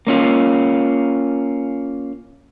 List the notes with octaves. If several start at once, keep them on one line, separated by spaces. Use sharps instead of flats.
A#3 C#4 F4